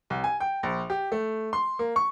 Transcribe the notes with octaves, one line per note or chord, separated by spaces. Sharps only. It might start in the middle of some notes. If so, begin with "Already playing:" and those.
C2
G#5
G5
A#1
G4
A3
C6
A#3
C#6